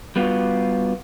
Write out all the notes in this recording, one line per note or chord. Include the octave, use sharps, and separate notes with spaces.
G3 B3 F4 F#4